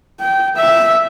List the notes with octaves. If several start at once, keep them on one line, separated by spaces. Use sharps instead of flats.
G5
E5